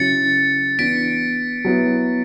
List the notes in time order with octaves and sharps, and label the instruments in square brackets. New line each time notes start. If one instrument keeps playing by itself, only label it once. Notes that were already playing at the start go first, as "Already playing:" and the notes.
Already playing: [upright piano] C#3 F#3 C#4 E4 [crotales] A6 C#7
[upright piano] E3 B3 D4 [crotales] B6 D7
[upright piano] F#3 B3 E4